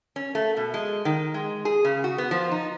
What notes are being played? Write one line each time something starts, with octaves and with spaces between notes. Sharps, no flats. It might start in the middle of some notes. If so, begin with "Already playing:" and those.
C#4
A3
B2
G#3
D#3
G#3
G#4
C#3
F#4
B3
F3
D#4